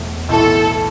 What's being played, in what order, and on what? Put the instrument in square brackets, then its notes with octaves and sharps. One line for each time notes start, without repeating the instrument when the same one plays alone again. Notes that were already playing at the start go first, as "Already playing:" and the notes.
Already playing: [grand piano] E1 E2 B2 A3
[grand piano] B1 A2 E3 [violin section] A4